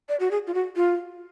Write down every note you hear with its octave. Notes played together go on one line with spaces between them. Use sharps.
D5
F#4
G#4
F4
F#4
F4